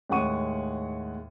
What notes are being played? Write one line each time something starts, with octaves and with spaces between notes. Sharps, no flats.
D#2 A2 G#3 F#5 C#6 D#7